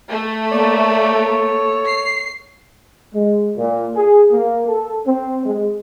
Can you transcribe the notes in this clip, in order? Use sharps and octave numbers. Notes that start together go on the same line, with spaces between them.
A3
A#3 C#5 D5
A4
C7
G#3
A#2
G#4
A#3
A4
C4
G#3